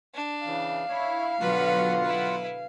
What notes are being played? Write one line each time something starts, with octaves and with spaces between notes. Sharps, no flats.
D4
C#3 E3 F5
E4 C#5
B2 D3 F#3 F4 B4 F#5
E4 B4